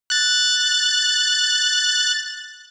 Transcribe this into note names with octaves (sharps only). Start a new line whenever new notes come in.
F#6 A6